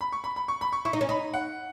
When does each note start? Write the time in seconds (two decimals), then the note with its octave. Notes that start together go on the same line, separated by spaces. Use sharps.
0.01 B5
0.12 C#6
0.24 B5
0.36 B5
0.48 C#6
0.61 B5
0.72 C#6
0.85 E4 C#6
0.93 D#4
1.01 C#4
1.09 D#4 B5
1.34 F#5